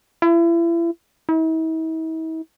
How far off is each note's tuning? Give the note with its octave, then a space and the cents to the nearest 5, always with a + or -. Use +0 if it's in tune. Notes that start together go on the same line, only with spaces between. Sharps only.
E4 +35
E4 -45